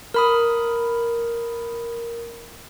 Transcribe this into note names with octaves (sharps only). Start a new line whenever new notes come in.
A#4 B5 D#6